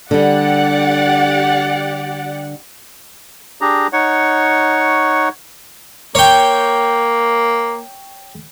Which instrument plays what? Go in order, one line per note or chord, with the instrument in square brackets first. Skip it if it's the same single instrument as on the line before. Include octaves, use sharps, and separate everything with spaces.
[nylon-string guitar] D3 G3 [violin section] G4 D5 F#5
[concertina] D4 G4 G#4 A#5
D#4 C#5 F#5 C#6
[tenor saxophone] A#3 [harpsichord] C#5 G5